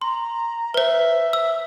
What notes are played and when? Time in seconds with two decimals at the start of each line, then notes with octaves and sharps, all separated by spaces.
0.01 A#5 C6
0.74 B4 C5 E5
1.33 E6